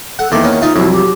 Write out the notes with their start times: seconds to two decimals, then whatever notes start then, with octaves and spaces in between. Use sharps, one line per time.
0.19 A4 F#5
0.32 E2 D#3 A3 A#3 D5
0.43 B3 C#4
0.62 D#4 F4 E5
0.76 C2 F2 F#3 E4
0.93 G4